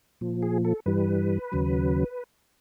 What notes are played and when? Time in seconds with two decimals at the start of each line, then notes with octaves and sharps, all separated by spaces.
0.21 A#2 F3
0.43 G#4
0.65 A4
0.86 G2 E3 G3 B4
1.52 D#2 C#3 F#3